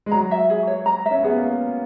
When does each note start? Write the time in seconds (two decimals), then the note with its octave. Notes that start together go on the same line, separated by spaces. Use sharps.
0.06 G#3
0.12 F#3 A#5
0.31 E5
0.50 G#4
0.67 C#5
0.86 A#5
1.06 C#4 E5
1.23 B3 G#4
1.36 A#3